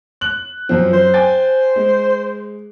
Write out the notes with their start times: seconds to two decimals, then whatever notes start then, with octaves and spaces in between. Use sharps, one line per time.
0.21 F#6 F#7
0.69 F#2 F3 C4
0.93 C5
1.14 G5 G#5 A6
1.76 G#3